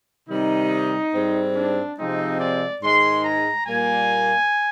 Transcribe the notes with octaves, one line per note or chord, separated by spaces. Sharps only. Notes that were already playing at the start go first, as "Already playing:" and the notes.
C3 D#3 G3 D#4
G#2 G3 C4
D4
C3 F3 G#3 C4 D#4
D5
G#2 D#3 G#3 C6
A#5
A#2 G3 A#3 G#5